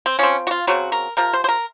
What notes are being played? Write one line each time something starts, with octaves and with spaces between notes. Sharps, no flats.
C4
F3 C4 C#4
F#4
F4
C#3 F#3 C4 F#4
A#4
C3 F3 A#4
C5
C5
A#4